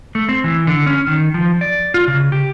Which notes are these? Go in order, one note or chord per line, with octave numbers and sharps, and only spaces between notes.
A3
C4
E3
D3
C#4
D#3
F3
D5
F4
C#3
G4